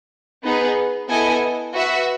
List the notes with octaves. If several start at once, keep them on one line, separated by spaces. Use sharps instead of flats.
B3 D#4 G#4 B4
B3 E4 A4 D#5 G#5
F#4 B4 E5